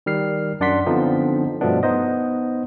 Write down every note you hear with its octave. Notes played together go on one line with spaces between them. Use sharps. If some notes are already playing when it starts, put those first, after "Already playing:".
D#3 G3 F6 C7
F#2 D4 D5 F#5 C6 B6
D3 F3 B3 C4 D#4
G2 B2 F3 A3 B3 D4
B3 D#4 C5 D#5